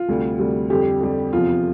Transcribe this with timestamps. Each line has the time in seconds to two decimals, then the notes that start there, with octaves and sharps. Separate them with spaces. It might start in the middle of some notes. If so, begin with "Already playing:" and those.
Already playing: F4
0.08 D2 C3 G3
0.39 D2 C3 G3
0.70 F2 D3 G3 G4
1.01 F2 D3 G3
1.33 E2 C3 F3 F4